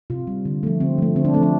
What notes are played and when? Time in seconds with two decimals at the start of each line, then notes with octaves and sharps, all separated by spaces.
0.10 C3 F4
0.27 G3
0.45 D3
0.63 F3 A3
0.80 D3 C4
0.98 F3 A3
1.16 D3 C4
1.25 D4
1.34 F3 A3 C4
1.43 D4